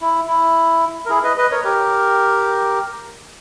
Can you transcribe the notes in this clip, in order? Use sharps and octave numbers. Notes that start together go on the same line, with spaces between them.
E4
E4
A#4
E4 G#4
B4 D#5
B4 D#5
A#4 C#5
G4 A#4